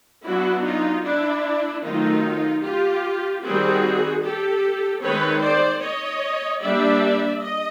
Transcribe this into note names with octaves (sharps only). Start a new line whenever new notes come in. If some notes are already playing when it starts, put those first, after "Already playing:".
F#3 B3 D4 E4 F#4
D#4 F4
D4 E4
D#3 F#3 A3 C4 D#4 F4
F4 G4
D#3 G3 C4 F#4 G#4
G4 A4
D#3 G#3 C4 B4 C#5
C5 D5
C#5 D#5
G3 A#3 D4 D5 E5
D#5